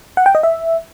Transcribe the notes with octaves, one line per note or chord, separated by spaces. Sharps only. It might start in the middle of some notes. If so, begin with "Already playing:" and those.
F#5
G5
D#5
E5